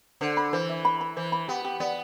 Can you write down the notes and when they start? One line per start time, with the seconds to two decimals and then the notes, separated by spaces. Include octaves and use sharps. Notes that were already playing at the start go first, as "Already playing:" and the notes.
0.21 D3 C5
0.37 B5
0.53 E3 C5
0.69 E5
0.85 B5
1.01 B5
1.16 E3 C5
1.32 B5
1.48 B3 G4
1.65 G4
1.80 B3 D5